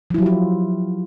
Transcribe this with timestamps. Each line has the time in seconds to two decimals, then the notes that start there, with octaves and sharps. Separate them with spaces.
0.10 F3
0.14 E4
0.18 F#3
0.22 G4
0.26 F4